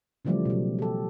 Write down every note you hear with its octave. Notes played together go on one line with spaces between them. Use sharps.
C#3 E3 F3 G3 A3 D5
B2 F#3
G4 A4